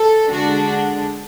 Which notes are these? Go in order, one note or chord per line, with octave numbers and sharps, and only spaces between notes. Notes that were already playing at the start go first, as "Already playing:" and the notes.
Already playing: A4
D3 G#3 D4 F#4